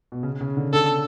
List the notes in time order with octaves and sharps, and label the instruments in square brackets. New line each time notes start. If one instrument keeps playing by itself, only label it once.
[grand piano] B2
C#3
C#3
D3
[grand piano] D3 [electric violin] A4